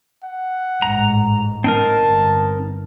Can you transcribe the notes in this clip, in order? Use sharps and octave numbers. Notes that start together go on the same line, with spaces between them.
F#5
A1 G#2 A#5
C4 D#4 A#4 A5
G1